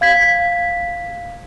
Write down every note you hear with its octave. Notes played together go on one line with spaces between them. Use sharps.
F5 G#6 B6